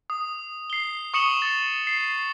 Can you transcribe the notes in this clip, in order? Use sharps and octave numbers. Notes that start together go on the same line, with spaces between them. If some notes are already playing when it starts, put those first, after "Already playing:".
D#6
C7 G7
C#6 D#6 C#7 E7 F#7 G7
A6
C7